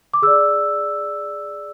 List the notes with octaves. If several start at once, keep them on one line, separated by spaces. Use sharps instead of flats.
D6
G#4 D5 E6